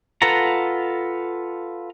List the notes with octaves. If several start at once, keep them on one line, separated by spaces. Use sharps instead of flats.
F4 A4 B4 F#5 A#5